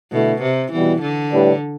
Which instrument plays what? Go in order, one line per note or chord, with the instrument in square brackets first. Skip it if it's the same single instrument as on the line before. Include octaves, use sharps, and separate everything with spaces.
[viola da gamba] B2 [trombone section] D3 A3 E4
[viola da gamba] C3
[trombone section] B2 G3 B3 [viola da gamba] E3
[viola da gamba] D3
[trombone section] A2 G3 D4 G4 B4